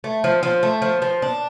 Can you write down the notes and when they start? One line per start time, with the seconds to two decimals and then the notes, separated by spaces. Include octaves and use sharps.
0.04 A3
0.24 F3
0.43 F3
0.63 A3
0.82 F3
1.02 F3
1.22 D4